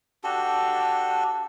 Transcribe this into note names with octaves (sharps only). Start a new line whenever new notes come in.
D4 F#4 G4 A4